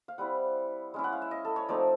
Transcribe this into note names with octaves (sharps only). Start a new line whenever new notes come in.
F5
G3 C4 E4 F#5
G#3 C#4 E4
F#5
F5
E5
D#5
A4
C#5
F3 A3 C4 D#4 D5